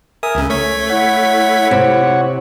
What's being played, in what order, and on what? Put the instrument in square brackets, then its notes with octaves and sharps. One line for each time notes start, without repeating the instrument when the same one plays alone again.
[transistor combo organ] A#4 E5 G#5 [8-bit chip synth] D#6
[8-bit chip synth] C#2 C#3
[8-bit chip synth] A3 G#6 B6 [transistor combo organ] C#5
[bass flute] E4 [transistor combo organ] C#5 F#5
[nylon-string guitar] C3